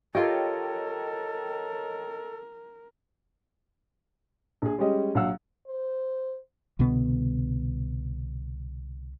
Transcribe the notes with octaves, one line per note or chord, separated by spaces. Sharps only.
F4 G4 A4 A#4 C#5 D#5 G5
A#1 G#4
G3 G#3 C#4 G4 D#5
A#1 F#3 F5 F#5 E6
C5
C2 B2 D3 B3